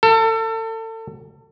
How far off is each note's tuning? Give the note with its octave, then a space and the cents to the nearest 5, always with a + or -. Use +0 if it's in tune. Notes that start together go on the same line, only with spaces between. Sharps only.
A4 +30